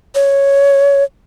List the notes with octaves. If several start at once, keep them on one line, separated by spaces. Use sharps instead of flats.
C#5